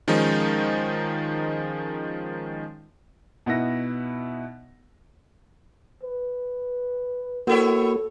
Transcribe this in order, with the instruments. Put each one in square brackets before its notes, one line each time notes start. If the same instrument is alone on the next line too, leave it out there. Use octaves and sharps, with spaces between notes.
[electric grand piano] D#3 F3 G#3 C#4 D#4
[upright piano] B2 B3 D#4 E4 A#6
[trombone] B4
[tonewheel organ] A#3 F#4 [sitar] B3 E4 C#5 [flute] A4